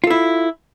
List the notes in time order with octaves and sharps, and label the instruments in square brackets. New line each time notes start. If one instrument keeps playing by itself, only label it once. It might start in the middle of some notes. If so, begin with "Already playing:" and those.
[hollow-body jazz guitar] F4
A4
E4